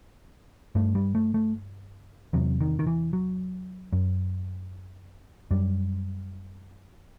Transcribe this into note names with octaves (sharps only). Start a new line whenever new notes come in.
G2 A3
G3
A3
A3
E2 C3 F#3
D#3
D#3
E3
F#3
F#2
F#2 G3